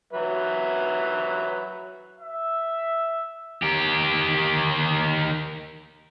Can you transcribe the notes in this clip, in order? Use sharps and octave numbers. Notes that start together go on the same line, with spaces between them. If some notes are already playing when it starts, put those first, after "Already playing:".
F#3 B4 E5
E5
D#3 G4